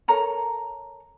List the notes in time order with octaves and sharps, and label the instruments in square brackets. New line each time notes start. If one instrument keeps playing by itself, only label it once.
[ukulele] A4 A#4 C#5 A#5